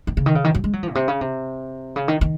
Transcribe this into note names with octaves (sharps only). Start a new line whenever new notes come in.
D#3
C#3
D#3
C#3
D#3
F#3
G#3
F#3
F3
A#2
C3
C#3
C3
C#3
D#3
D#3